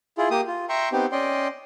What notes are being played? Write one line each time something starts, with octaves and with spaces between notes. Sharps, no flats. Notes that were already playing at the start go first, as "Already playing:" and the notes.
E4 F4 G#4
A#3 G4 D#6
F4
E5 G5 A#5 C6 C#6
B3 C4 D#4 G4
C#4 D5 D#5 G5 C6